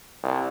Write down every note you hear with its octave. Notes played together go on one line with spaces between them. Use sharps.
C2